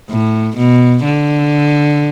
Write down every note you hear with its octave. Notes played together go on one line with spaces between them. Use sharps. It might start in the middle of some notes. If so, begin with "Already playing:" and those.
A2
B2
D3